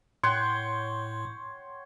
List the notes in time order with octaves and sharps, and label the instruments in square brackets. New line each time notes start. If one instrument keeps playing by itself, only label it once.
[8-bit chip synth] A2 [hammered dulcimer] C#5 F#5 G5 [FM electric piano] C6